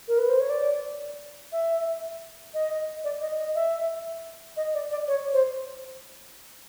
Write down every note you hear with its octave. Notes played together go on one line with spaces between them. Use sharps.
A#4
B4
C5
C#5
D5
E5
D#5
D5
D#5
D#5
E5
D#5
D5
D5
C#5
C5